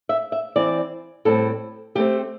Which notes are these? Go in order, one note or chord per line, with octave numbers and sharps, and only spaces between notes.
E5
E5
E3 C4 D5
A2 G3 C4 A4
D3 A3 C4 G4